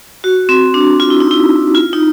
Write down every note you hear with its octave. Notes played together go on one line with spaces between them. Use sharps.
F#4
C4
D4
F4
E4
D#4
E4
F4
D#4